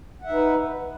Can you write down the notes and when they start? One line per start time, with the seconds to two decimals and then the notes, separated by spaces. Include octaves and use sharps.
0.21 F#5
0.25 E5
0.29 D#4
0.33 B4